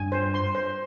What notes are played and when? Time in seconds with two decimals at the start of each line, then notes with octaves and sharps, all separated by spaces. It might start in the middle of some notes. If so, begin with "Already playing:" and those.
Already playing: G2 G#5
0.12 C5
0.34 C6
0.55 C5